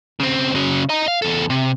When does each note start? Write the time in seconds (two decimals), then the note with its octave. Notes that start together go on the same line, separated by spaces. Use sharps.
0.20 C#3 C4
0.55 C#3 F#3
0.89 D#5 A#5
1.08 F5
1.22 E2 A4
1.50 C3